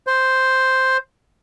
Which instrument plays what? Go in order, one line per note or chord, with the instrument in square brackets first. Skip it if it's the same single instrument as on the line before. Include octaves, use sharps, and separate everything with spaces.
[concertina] C5